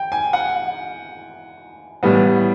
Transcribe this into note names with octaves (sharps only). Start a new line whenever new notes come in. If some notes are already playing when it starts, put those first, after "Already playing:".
Already playing: G5
G#5
F#5
A2 E3 G3 B3